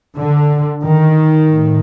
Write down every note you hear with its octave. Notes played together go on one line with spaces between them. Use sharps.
D3
D#3
A2